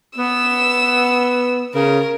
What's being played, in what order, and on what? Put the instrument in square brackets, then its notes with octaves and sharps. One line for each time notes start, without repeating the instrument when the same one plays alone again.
[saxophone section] B3 [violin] E6
[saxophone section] C#3 [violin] A#4